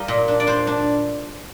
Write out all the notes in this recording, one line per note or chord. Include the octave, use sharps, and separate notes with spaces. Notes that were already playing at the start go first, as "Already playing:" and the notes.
Already playing: G3 D#4 D#5 F5
A#2
D4
D5
D4 C5
D4